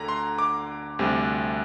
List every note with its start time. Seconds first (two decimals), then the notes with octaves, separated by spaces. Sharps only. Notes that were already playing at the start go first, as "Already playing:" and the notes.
Already playing: D2 D3 A#5
0.08 C6
0.39 D6
0.99 D2 C3 G3